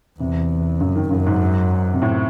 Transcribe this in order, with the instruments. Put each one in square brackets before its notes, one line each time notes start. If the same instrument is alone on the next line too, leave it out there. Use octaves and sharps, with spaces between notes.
[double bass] E2 [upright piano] C3
[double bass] F#2 [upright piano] C#3
[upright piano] D#3
[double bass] F#2 [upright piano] C#3
[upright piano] G#2
C3
A2